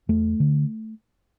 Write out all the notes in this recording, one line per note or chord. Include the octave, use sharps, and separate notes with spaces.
E2 A3
D3